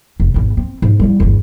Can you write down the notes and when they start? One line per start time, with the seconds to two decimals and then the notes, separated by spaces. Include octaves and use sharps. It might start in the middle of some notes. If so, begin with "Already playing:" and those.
0.20 F1
0.34 G#1 E2
0.57 C4
0.82 G#2
1.00 G3 E4
1.20 G1 E2